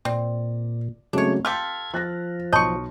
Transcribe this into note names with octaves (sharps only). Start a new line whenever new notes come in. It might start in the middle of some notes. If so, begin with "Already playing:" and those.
A#2 C4 D5
C#3 F#3 G#3 A3 C4 D4 C#5
F4 G4 A4 F6 G#6 B6
F3 F#6 A6 A#6
B1 C#5 D#5 A5 C6 C#6